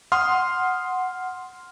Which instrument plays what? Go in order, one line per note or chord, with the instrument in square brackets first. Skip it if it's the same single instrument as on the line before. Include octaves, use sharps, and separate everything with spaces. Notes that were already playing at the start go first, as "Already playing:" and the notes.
[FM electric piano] F#5 [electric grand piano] C6 D#6 F6